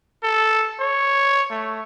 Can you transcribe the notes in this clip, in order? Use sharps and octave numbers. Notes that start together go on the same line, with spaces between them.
A4
C#5
A3